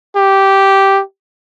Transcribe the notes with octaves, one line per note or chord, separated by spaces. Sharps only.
G4